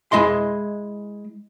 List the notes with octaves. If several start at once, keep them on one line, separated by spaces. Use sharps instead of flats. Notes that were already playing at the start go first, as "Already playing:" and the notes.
G#3 E4 D#5 C6